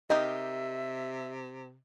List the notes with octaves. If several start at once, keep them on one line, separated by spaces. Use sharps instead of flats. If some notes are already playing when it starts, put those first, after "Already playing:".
C3 D#4 G4 A#4 D#5 E5